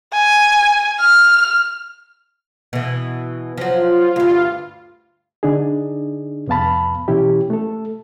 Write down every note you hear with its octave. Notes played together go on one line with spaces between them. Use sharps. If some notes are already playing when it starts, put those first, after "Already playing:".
G#5
F6
B2 E3
F3 F#3
F4
D2 G2
D3 D4 D#4 G#4
C2 F2 B3 F5 A5 B5
B2 E3 C#4 E4 G4
A3 A4